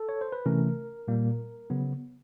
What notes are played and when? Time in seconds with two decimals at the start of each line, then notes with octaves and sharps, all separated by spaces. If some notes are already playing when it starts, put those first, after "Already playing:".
Already playing: A4
0.09 C#5
0.21 C5
0.32 B4
0.46 C3 E3 A3 C#4 A#4
1.08 A#2 G3 A#3
1.70 C#3 F#3 B3